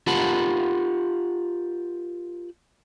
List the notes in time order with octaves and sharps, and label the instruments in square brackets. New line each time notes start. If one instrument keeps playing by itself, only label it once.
[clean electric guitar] F4 G4 A#4 F#5 A5 B5